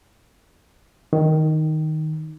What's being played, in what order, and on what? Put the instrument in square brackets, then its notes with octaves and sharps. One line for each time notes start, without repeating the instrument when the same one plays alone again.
[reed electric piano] D#3